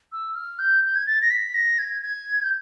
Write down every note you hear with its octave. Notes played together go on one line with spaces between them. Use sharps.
E6
F6
G6
G6
G#6
A6
A#6
B6
A#6
G#6
G#6
G6